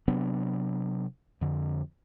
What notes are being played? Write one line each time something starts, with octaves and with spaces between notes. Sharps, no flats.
C3 F#3 B3 D4
F2 D3